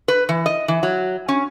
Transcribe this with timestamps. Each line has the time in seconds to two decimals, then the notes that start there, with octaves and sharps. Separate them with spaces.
0.08 B4
0.29 E3
0.46 D#5
0.68 E3
0.83 F#3
1.28 C#4